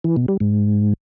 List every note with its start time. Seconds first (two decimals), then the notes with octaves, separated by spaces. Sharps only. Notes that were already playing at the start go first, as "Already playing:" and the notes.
0.04 E3
0.16 B2
0.28 G3
0.40 G#2